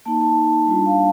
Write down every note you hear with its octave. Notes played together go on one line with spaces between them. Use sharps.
A#3 D#4 A5
A5
G3 D4 F4
F5